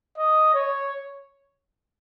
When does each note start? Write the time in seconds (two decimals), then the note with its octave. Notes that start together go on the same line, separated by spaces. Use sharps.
0.18 D#5
0.54 C#5